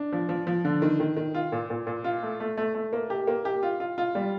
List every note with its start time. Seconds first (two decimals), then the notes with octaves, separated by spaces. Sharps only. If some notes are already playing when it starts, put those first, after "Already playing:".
Already playing: D4
0.12 F3
0.29 F3
0.47 F3
0.65 D3
0.82 D#3
1.00 D#3
1.17 D#3
1.35 F4
1.52 A#2
1.70 A#2
1.87 A#2
2.04 F4
2.23 A3
2.40 A3
2.57 A3
2.75 A3
2.93 A#3
3.10 G4
3.27 A#3
3.45 G4
3.63 F4
3.80 F4
3.98 F4
4.15 G3